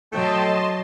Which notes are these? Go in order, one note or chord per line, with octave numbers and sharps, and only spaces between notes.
F#3 A3 D#5 G5 A5 C6